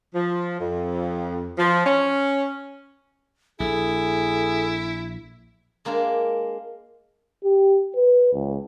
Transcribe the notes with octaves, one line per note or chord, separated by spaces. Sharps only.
F3
F2
F3
C#4
A#1 E4 G#4 A4
G#3 A#3 D4 D5 F5
G4
B4
C#2